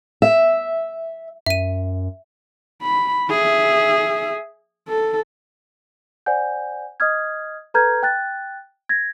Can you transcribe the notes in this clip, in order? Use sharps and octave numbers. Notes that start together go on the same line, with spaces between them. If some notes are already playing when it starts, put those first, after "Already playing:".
E5
F#2 E5 D#7
B5
G#4 E5
A4
C5 D5 F#5 G#5 G6
D#5 D#6 F6 G#6
A4 B4 A#5 F6 G6 G#6
G5 F#6 A6
G#6 A#6